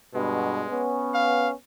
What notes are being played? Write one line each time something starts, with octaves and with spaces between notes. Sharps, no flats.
G2 B2 G#3
B3 C#4
F5